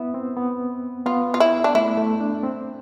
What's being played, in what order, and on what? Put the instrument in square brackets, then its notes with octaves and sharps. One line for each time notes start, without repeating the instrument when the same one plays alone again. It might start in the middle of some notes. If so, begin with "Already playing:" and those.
Already playing: [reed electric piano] B3 [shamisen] E4
[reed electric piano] C4
B3
[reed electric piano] B3 [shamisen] F4
[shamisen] F4
E4
D4
[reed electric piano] A3 [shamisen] E4
[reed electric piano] A3
D4
C4